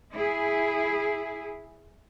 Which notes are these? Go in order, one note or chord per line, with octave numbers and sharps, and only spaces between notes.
E4 G#4